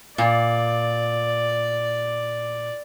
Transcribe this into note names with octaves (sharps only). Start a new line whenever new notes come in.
A#2 D5